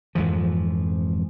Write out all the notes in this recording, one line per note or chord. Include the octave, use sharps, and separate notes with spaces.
F2 G#2 E3 F3